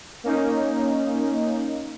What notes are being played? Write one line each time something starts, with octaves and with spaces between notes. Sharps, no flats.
A#3 C#4 D#4